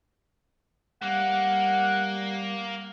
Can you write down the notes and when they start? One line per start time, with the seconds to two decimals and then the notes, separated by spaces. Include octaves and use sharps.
1.02 G3 A#3 F#5